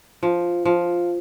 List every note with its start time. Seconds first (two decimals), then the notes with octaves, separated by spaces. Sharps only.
0.23 F3
0.65 F3